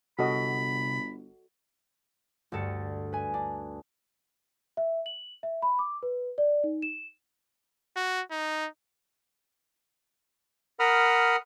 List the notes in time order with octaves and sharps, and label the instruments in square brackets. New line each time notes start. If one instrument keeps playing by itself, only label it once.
[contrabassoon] G1 [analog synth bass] C3 [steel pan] F#4 A4 D#5 [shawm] B5
[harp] D2 G2 A4 A6 C#7
B4 G#5
D4
[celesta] E5
F#7
E5
B5
D6
B4
D5
D#4
E7
[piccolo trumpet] F#4
D#4
[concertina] A#4 F#5 B5 D#6 F6